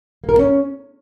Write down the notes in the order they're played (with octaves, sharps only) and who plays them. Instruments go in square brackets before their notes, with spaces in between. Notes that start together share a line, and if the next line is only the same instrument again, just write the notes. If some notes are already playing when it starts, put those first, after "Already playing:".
[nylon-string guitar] A#3
A#4
A#3
C#4